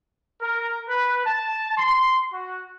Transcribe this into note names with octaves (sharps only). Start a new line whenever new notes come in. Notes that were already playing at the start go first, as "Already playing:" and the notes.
A#4
B4
A5
C6
F#4